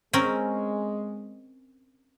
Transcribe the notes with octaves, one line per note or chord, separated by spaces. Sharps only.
G#3 C4 C#4 A#4